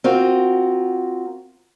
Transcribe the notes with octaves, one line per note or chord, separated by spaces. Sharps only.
C4 F4 F#4 A#4